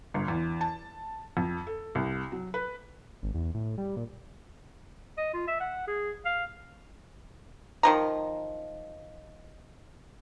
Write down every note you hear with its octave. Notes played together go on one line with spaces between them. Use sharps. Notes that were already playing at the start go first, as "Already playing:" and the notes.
G1
E2
A5
F2
A4
C2
F#3
B4
G#1
E2
A2
G3
A#2
D#5
F4
E5
F#5
G#4
F5
D#3 F3 A#5